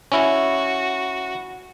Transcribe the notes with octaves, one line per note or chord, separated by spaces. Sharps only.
C#4 E4 F#4